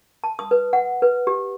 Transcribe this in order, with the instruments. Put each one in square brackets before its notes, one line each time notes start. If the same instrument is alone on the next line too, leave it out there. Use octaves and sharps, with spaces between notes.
[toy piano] A5
D#6
B4
F#5
B4
G4